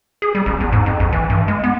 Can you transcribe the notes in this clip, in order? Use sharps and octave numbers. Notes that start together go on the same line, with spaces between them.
G#4
G3
A1
E2
G#2
F2
A#1
E3
G2
G#3
B3